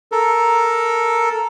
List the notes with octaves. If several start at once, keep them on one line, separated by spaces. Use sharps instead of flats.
A4 A#4